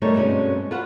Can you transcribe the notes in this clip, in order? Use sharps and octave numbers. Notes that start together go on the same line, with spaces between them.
D3 G3 A3 D#4 A#4 C#5
G2 B2 G#3 A3 C4 C#4
F4 F#4 B4 C5 F5 F#5